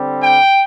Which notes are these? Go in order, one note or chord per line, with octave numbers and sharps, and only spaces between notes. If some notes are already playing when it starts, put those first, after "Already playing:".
Already playing: D3 G3 C4
G5